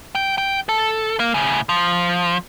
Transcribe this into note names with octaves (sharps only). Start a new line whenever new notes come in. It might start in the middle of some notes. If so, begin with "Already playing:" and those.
G5
G5
A4
A#3
A2 C#3
F3